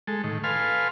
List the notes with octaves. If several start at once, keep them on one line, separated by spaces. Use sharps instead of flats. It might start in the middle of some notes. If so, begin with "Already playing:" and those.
G#3 A4
A2 D#3
A4 B4 F5 G#5 C6 F6